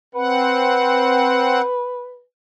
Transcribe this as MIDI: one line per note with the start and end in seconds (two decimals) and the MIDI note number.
0.15 1.61 60
0.15 2.22 71
0.15 1.61 78